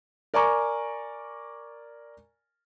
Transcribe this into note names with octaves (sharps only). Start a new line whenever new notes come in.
A#4 D5 G#5 A#5 C#6 D6